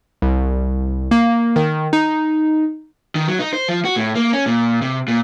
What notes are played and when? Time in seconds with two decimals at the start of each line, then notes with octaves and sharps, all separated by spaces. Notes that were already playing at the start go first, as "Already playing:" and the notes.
0.22 C2
1.11 A#3
1.56 D#3
1.93 D#4
3.15 D#3
3.27 F#3
3.39 D#4
3.53 C5
3.68 F3
3.85 F#4
3.96 A2
4.15 A#3
4.33 C#4
4.46 A#2
4.82 C3
5.08 A#2